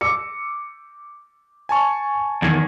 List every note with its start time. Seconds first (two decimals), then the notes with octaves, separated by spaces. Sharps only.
0.01 D6 E6 C#7
1.69 G#5 A5 C#6
2.42 E2 D#3 G#6